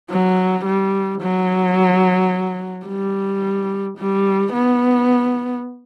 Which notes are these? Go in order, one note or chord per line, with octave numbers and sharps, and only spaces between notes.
F#3
G3
F#3
G3
G3
B3